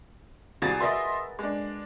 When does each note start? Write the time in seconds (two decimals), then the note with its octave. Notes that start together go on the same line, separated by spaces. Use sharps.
0.62 C2 F#4 G#4 D5 A6
0.80 A#4 B4 D#5 E5 C6
1.39 G#3 D4